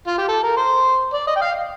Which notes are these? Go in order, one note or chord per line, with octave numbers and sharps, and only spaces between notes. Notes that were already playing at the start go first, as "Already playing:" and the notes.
F4
G4
A4
A#4
C5
D5
D#5
G5
F5